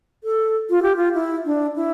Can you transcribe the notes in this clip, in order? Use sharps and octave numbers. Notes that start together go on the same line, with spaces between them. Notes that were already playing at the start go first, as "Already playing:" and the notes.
A4
F4
G4
F4
E4
D4
E4